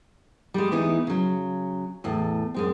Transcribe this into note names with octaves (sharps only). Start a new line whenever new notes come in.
G3 G#3
E3 B3 D#4 E4
C#3 F#3
E2 A2
F#2 G#3 C4